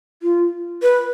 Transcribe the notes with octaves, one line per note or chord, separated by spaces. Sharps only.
F4
B4